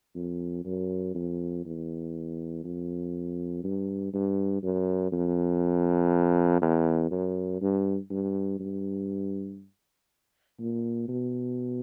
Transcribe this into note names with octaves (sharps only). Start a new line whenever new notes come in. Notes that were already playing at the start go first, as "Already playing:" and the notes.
F2
F#2
F2
E2
F2
G2
G2
F#2
F2
E2
F#2
G2
G2
G2
A#2
B2